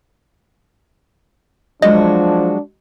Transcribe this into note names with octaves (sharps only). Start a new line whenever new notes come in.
F3 F#3 G#3 D4 F#4 D#5